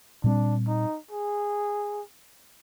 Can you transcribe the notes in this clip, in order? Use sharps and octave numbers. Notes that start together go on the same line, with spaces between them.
A#2 G3 C4 D4
D#4
G#4